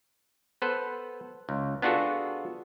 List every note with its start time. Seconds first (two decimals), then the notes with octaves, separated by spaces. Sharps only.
0.62 B3 A4 B4 C5
1.49 C#2
1.82 B3 D4 F4 F#4 G#4 A4